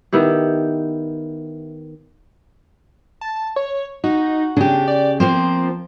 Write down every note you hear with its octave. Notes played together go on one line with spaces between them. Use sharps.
D#3 B3 E4 G4
A5
C#5
D#4 F#4
C#3 D4 G4
D5
F3 A#3 C4 C5